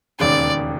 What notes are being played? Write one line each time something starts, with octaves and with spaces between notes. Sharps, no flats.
E1 D#2 C#3 D5